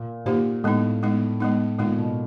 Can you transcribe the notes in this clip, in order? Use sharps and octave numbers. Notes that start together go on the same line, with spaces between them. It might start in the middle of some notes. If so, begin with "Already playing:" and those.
Already playing: A#2
A#2 A#3 D#4 G4 C5
A2 G#3 B3 D#4
G#3 B3 D#4
G#3 B3 D#4
A#2 G#3 B3 D#4
B2